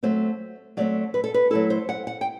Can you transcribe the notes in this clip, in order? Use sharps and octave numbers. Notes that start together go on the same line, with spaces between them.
F#3 A3 C4 C5
F#3 A3 C4 D5
B4
A4
B4
F#3 A3 E4 A4
C5
F#5
F#5
G5